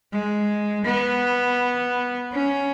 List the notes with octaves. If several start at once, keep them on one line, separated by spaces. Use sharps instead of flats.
G#3
B3
C#4